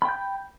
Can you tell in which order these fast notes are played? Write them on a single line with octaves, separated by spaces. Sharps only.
B5 G5 G6